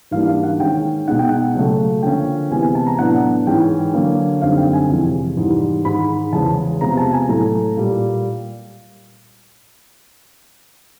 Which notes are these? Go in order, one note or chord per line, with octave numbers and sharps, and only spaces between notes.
G#2 E3 G3 A#3 D4 F5
F5
F#5
D#3 G#3 C#4 G5
B2 G#3 B3 D#4 F#5
G5
F#5
C#3 F#3 A3
D3 F3 A#3 C#4 G5
C3 E3 G#3 B3 G#5
G#5
A5
A#5
A2 F#3 B3 D4 F#5
G#2 E3 G#3 C#4 G5
D3 F#3 A#3 C#4
F#2 D3 G3 C4 D#4 F5
G5
G#5
F2 C3 E3 G#3 C#4
G#2 E3 G3
G#2 D#3 G#3 B5
E2 C#3 E3 G#3 A5
C3 F3 G#3 B3 A#5
A5
G#5
A2 F#3 A3 A#5
A#2 G3 A#3